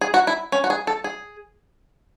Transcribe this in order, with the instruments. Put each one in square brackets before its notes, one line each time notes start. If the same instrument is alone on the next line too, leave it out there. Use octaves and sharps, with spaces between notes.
[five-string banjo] G#4
F#4
E4
C#4
F#4
G#4
A4
G#4